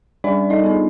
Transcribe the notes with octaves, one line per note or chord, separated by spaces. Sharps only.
G3 D4 D5
D#4 D#5
B3 D4